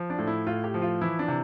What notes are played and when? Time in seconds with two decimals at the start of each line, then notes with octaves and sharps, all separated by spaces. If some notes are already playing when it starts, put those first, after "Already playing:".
Already playing: F3
0.10 D4
0.18 A2
0.27 E4
0.47 A2 F4
0.64 G4
0.74 F3
0.82 F4
1.01 E3 E4
1.19 D4
1.28 C3